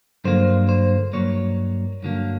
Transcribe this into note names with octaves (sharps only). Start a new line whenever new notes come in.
G2 D3 F#3 A#3 C5
C5
G2 D3 F#3 A#3 C#5
G2 D3 F#3 A#3